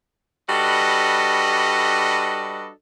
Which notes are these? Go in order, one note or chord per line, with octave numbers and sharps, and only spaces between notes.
G3 D4 F#4 A4 B4 D#5